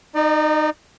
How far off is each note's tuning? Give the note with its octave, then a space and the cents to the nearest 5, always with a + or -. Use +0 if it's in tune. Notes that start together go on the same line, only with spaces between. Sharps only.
D#4 -15 D5 +40